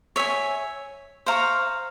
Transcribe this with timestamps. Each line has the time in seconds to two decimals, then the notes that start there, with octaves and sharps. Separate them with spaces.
0.16 C#5 E5 G#5
1.26 C5 F5 A#5 C#6